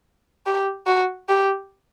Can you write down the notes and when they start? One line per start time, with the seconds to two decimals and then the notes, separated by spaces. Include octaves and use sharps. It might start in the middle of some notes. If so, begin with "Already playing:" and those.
0.46 G4
0.87 F#4
1.29 G4